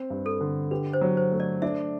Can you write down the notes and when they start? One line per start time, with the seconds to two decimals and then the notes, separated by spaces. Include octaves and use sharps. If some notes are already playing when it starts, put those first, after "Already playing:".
Already playing: C4
0.10 G2
0.26 A4
0.40 D3
0.71 G4 B4
0.93 C5
1.01 F#3
1.17 C5
1.32 A3
1.40 D5
1.62 D4 E5